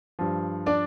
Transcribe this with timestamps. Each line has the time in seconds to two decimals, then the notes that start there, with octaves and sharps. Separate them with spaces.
0.19 G2 F3
0.66 D4 D5